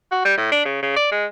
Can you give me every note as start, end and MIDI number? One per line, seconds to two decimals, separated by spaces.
0.12 0.24 66
0.25 0.35 55
0.37 0.50 45
0.52 0.64 62
0.66 0.80 49
0.83 0.93 49
0.96 1.11 74
1.12 1.26 56